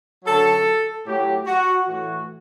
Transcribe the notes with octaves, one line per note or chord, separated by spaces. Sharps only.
F#2 D3 F#3 A4
A2 F#3 G4
F#4
A2 E3 F#4